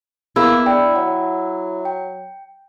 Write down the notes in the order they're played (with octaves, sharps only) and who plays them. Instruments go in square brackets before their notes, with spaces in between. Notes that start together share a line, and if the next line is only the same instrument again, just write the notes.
[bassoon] A#3 [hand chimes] B3 G#4 [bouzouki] E4
[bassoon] D4 [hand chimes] G5
[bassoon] F#3 [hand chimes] F#5
[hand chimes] G5